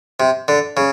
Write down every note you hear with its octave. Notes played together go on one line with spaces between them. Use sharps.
C3
D3
C#3